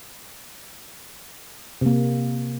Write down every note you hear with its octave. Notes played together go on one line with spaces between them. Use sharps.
C3 A#3